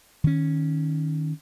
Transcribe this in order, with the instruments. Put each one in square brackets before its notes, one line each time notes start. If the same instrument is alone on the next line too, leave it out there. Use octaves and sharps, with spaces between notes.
[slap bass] D#3 C#4